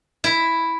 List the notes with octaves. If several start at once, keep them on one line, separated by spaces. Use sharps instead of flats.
E4